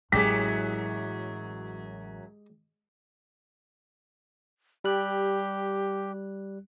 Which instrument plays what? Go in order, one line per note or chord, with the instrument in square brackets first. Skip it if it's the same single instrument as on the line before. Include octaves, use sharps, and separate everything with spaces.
[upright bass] A1 E4 [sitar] F#2 F#3 [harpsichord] G#3 G4 [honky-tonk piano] B6
[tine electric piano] G3 F#6 [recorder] G4